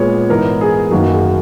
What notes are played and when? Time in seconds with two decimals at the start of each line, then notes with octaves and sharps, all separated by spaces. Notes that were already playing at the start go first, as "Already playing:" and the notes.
Already playing: A#2 G#3 B3 C#5
0.29 G#2 E3 B3 A#4
0.61 G#4
0.91 F#2 D#3 F#3 A#3 F#4
1.12 G#4